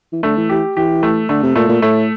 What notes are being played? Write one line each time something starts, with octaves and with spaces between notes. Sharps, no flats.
E3
D3 A3
E3
E3 G4
E3 G4
A3
D3 A3
C3
A#2 A3
A#2
A2 A3